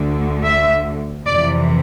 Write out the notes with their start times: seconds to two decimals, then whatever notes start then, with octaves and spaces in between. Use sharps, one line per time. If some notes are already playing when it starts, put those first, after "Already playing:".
Already playing: D2 D3
0.45 E5
1.26 F2 C3 E3 D5